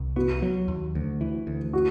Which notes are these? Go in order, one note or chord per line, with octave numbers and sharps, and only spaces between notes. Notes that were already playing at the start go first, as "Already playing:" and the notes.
Already playing: C2
B3 F#4
F#3
D#2
D2
E3
D2
F#4